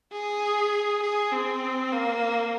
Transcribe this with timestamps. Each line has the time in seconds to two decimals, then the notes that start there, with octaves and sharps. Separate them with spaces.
0.12 G#4
1.03 G#4
1.32 C4
1.92 A#3